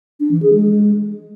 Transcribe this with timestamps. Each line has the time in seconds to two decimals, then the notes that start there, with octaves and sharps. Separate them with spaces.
0.20 D4
0.31 E3
0.43 G#4
0.54 G#3